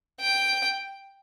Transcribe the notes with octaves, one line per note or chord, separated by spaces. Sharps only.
G5